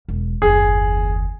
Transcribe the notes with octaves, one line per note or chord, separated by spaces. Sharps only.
E1
F#1 D#2 G#4